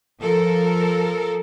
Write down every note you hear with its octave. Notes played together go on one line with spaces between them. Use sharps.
F3 A4 A#4